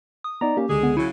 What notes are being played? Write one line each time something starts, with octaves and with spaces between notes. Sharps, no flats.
D#6
B3 D#4 D5 A#5
A#3 C#4 G4
C#2 D3 G#3 G#4
B3
C#3 F#3 E4